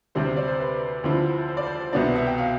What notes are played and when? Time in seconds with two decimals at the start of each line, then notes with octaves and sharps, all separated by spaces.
0.15 D2 C3 G3 C4 C5
0.26 C5
0.37 D5
0.48 C5
0.60 B4
1.04 D2 D3 F3 C4 E4
1.49 C5
1.57 D5
1.67 C5
1.93 C2 B2 B3 D4 D5
2.05 E5
2.16 E5
2.27 G5
2.38 F5